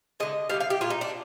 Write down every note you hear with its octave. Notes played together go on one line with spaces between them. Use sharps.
D3 G#3 D#5
D3 G3 F5
F5
G4
A#2 G#3 F4
D#4
D4